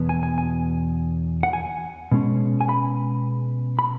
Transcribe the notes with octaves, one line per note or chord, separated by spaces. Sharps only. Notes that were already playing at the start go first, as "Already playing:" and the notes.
Already playing: E2 B2 B3
G#5
G#5
G#5
F#5
G#5
B2 G#3 C#4
G#5
B5
B5